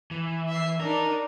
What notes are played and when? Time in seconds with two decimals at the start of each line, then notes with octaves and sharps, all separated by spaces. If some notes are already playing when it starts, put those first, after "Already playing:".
0.11 E3
0.48 E5 C7
0.80 D4 D#4 A#4